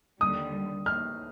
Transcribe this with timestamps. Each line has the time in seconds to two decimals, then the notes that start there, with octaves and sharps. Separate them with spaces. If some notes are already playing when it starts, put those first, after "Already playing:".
0.21 D#2 D3 G3 D#6
0.86 F6